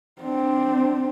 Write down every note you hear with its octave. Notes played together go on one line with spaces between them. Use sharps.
C4 D4